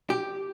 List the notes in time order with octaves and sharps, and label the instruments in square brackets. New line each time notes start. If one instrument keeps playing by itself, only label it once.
[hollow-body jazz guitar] G4